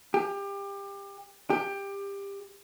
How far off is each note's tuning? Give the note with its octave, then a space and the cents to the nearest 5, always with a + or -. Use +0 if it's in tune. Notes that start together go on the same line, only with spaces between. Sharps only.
G4 +25
G4 +20